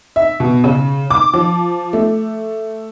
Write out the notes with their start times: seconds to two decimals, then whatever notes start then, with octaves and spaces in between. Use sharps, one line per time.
0.16 E5
0.40 B2
0.64 C#3
1.10 D6
1.34 F3
1.93 A3